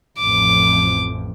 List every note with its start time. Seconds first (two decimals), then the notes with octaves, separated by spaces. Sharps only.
0.19 A1 F2 D6